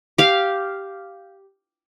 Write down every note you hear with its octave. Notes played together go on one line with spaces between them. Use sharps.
G4 F5